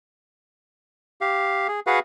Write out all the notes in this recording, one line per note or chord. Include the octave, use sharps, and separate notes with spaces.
G4 F5
G#4
F#4 G#4 B4 F5 F#5